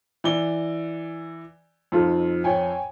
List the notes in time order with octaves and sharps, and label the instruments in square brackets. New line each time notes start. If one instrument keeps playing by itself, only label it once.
[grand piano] E3 D5 G7
[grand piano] F2 [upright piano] D#4 F4 A4
[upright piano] C#5 G5 G#5